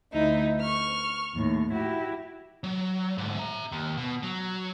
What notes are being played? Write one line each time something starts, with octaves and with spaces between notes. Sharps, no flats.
D2 D#4 E4
C#6 F6
D#2 A2
E4 F#4 G4
F#3
D2 G#2
E5 A#5
D#2
B2
F#3